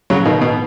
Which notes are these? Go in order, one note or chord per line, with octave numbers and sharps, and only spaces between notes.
C#3 F#3
B2 D#3
B2